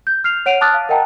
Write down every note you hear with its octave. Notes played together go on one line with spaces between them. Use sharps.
G6
F6 C7 F7
C#5 F#5 D7 D#7 F7
A5 D6 D#6 F6 F#6 A6
F5
A#4 D#5 F#5 G5 A5 A#5